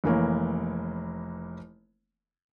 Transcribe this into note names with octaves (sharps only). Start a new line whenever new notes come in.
F1 E3 A#3 C#5